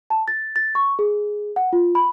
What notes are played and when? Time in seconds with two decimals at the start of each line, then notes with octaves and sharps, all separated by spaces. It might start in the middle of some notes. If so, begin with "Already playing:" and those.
0.10 A5
0.28 A6
0.56 A6
0.75 C#6
0.99 G#4
1.56 F#5
1.73 F4
1.95 B5